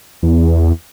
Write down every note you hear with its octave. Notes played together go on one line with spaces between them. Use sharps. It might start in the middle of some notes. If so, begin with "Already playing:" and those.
E2